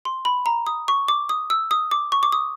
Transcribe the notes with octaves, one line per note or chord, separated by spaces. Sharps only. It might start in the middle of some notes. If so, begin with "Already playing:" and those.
C6
B5
A#5
D#6
C#6
D6
D#6
E6
D#6
D6
C#6
D6
D#6